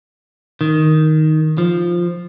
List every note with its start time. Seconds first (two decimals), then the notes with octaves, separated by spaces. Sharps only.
0.61 D#3
1.58 F3